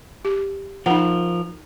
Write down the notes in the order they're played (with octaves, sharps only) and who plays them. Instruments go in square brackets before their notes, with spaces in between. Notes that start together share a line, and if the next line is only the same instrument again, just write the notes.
[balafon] G4
[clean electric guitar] F3 A#4 [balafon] D#4 F#5